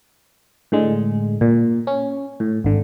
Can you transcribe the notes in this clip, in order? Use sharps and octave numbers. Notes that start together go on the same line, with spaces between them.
A2 D3 G#3
A#2
C#4
A2
G#1 D3